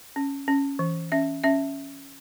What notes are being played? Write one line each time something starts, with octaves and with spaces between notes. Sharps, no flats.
C#4
C#4
E3
C#4 E5
C#4 E5